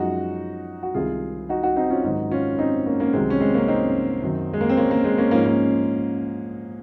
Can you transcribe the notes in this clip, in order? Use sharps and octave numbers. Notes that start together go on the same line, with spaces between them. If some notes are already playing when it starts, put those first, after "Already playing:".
Already playing: F#2 F3 G#3 D#4 F#4
F#4
C2 C3 D#3 G#3 F4 G#4
D#4 F#4
D#4 F#4
C4 D#4
C#4 F4
G#2 D#3 F#3 D#4 F#4
C#4 F4
C4 D#4
A#3 C#4
A#3 C#4
C2 C3 D#3 F#3 G#3 C4
C#4
G#3 C4
A#3 C#4
C4 D#4
F#2 D#3 F#3
G#3
A#3
C4
A#3 C#4
A#3
G#3 C4
A#3 C#4
G#2 F3 G#3 A#3 C#4
A#3